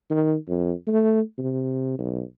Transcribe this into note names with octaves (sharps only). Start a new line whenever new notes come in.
D#3
F2
A3
C3
B1